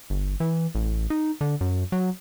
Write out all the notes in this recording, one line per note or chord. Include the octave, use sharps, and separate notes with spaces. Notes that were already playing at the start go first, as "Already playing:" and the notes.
G1
E3
A1
D#4
D3
F#2
F#3